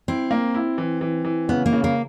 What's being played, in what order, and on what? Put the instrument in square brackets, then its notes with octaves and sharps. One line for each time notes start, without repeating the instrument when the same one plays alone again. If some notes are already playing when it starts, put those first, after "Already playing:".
[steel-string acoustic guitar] C4 [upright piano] E4
[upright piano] A#3
E4
E3
E3
E3
[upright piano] C#3 [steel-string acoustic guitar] B3
[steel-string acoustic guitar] A#3
[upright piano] C#3
[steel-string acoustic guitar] A#3